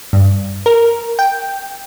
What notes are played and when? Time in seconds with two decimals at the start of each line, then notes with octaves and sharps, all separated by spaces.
0.13 G2
0.66 A#4
1.19 G5